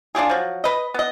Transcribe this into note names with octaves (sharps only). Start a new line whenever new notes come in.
D4 F4 G4 G#4
F3 F#3
B4 D#5
B3 D#5